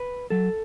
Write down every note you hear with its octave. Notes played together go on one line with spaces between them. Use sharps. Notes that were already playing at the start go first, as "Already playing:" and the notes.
Already playing: B4
F#3 A4